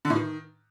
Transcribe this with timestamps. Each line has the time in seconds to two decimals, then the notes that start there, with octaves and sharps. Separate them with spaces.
0.05 D3
0.10 A2
0.15 D#3